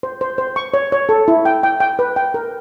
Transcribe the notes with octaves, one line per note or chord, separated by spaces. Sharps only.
C5
C5
C5
C#6
C#5
C#5
A4
E4
G5
G5
G5
B4
G5
A#4